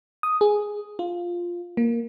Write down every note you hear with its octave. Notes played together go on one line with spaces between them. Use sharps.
D#6
G#4
F4
A#3